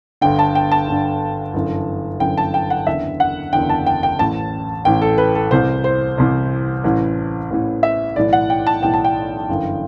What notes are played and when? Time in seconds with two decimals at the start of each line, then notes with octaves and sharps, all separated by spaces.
0.21 G1 G2 D3 G5
0.39 A5
0.55 G5
0.72 A5
0.87 G1 G2 D3
1.54 G1 F#2 E3
2.20 G1 F#2 E3 G5
2.38 A5
2.54 G5
2.70 F#5
2.87 F#1 E2 D3 E5
3.20 F#5
3.53 F#1 E2 D3 G5
3.70 A5
3.86 G5
4.03 G5
4.18 A1 A2 E3 A5
4.85 A1 A2 E3 G5
5.02 A4
5.18 B4
5.35 A4
5.51 C2 C3 E3 C5
5.84 C5
6.18 C2 C3 E3
6.84 A1 A2 E3
7.50 A1 A2 E3
7.83 E5
8.16 B1 A2 E3 D5
8.33 F#5
8.50 G5
8.67 A5
8.82 B1 A2 E3 G5
8.94 A5
9.05 G5
9.49 G1 F#2 E3